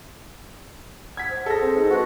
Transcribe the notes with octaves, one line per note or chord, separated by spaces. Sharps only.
F#5 G#6 B6
C5
G#4 A4 A#6
C4
G#2
F#4 B4